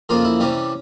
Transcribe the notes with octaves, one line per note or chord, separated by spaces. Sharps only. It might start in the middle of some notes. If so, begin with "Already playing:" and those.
F2 C#3 F3 A#3 F4
E4
C3 E3 G3 C#4